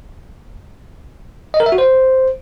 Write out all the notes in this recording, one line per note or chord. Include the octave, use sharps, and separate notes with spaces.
D#5
A#4
E5
F#4
C5